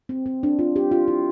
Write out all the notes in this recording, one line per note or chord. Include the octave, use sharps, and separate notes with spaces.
C4
C4
D4
F4
G4
F4
E4